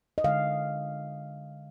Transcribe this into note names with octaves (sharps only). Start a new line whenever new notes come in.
D#5
D3 G#3 F5